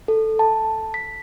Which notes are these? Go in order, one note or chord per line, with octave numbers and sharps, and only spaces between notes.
A4
A5
B6